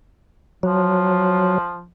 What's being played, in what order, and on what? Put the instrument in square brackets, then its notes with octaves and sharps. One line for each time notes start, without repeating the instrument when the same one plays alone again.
[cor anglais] F3 [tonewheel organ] F#3